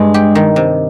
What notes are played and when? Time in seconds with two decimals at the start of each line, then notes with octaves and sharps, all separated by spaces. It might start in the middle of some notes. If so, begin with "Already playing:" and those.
Already playing: G2 G#3
0.14 G4
0.35 D#3
0.56 C3